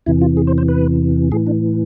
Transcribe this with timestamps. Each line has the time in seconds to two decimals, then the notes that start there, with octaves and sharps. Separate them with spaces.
0.06 E2 C3 E3 E4
0.21 F4
0.37 G#4
0.47 C5
0.58 C5
0.69 B4
1.32 A2 E3 G#4
1.46 D4